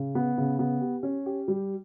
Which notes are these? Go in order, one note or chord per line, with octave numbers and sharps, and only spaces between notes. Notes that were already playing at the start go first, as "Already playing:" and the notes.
Already playing: C#3
B3
C#3
B3
G4
C#4
G4
G3